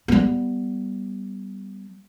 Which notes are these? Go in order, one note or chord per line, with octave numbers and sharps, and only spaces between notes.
G3 B3